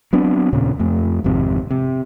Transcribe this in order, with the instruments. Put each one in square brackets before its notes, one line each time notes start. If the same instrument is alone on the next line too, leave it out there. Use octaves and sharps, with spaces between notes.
[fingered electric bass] F#3 B3 C4 D4
D#2 A#2 C#3
F2 A3
G#1 F2 G#2 C3
C3